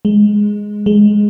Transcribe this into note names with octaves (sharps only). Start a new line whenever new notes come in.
G#3
G#3